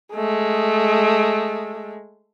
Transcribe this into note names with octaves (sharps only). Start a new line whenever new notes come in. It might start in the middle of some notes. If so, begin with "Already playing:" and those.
G#3 A3